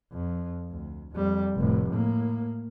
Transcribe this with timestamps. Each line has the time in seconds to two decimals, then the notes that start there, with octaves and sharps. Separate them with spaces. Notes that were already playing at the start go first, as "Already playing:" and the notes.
0.12 F2
0.71 D2
1.12 F2 G3
1.56 F1 A2
1.90 A2 A#3